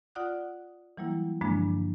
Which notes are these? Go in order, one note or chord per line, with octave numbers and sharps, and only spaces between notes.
F4 D5 F#5 D#6 F#6
E3 F#3 G3 A#3 E4
G2 D3 F3 G#3 A#3 D4